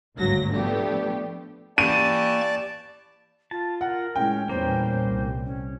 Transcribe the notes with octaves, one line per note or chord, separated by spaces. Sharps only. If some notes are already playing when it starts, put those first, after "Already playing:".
G#1 D2 G2 F#3 A#6
F3 A3 B3 D4 G4
E3 A#3 G4 D5 A5 C#6 A6 D#7
F4 A5
A#4 F#5
A2 G#3 C#4 G5
E2 A#2 G3 A#3 C#4 C5
C2
C#4